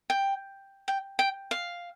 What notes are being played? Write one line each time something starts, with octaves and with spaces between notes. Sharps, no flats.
G5
G5
G5
F5